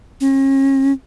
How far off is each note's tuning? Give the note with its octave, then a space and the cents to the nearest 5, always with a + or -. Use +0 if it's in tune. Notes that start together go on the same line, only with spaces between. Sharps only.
C#4 -40